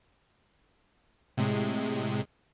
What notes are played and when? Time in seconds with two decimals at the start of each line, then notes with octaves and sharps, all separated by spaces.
1.37 A2 C3 G#3